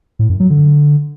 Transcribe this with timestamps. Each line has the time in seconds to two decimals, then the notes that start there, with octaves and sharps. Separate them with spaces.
0.19 A2
0.30 F#2
0.40 F#3
0.50 D3